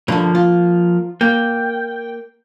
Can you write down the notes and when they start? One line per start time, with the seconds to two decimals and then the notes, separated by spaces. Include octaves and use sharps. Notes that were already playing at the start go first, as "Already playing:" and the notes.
0.08 G2 D3 F3 A#3
0.35 F4
1.21 A#3 G5